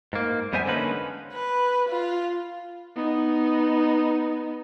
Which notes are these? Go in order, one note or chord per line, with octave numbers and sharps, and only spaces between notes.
G#2 A#3
F2 G3 B3 C5 E5 G#5
D3 G#3 A#3 C#4 D#4 B4
B4
F4
B3 D#4